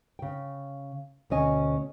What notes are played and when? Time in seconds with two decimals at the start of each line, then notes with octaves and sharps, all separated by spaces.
0.19 C#3 G5
1.30 D2 B2 C#4 D#5 G#5